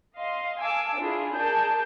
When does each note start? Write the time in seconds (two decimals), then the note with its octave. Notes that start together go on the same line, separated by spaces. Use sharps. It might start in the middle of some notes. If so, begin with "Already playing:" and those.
0.16 D#5 F5 C6
0.60 F5 G#5 A5 D6 E6
0.97 D4 E4 F4 G#4
1.34 G#4 A#4 D5 A5 G6